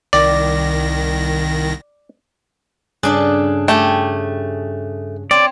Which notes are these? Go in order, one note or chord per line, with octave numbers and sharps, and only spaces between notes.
C2 D#3 D5 A#6
G2 C#3 D4 G#4 A4 F#6
A3 G4 G5 G#5
C4 C#5 D5